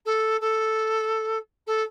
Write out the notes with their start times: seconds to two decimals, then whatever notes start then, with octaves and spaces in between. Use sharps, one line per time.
0.05 A4
0.41 A4
1.67 A4